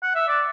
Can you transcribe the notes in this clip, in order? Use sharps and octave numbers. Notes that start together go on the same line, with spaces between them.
F#5
E5
D5